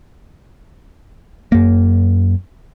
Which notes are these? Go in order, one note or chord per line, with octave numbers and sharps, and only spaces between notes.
F#2 A#3